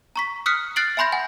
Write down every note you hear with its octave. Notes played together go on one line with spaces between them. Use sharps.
A#5 C#6 B6
D#6 F6 F#6 B6 C#7
F6 F#6 A6 C7 D7 F#7
E5 G#5 B5 C6 G6 A#6
F#5 G#5